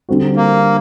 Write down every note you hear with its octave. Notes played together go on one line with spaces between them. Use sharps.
D3 G3 C4 F#4
A#3